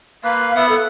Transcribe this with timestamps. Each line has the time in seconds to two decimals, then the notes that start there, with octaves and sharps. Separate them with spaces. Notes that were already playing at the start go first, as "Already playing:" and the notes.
0.24 A#3 B4 F5
0.56 B3 E5 F#5
0.69 A4